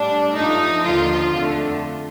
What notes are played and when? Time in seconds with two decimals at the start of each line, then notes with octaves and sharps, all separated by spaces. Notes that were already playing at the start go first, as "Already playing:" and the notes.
Already playing: A2 G3 D4
0.35 G2 F3 A3 D#4
0.84 D#2 D3 F3 F4
1.33 F2 D3 A3